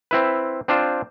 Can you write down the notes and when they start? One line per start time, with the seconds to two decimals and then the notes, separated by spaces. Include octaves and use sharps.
0.11 C4 E4 B4
0.68 C4 D4 F4 C5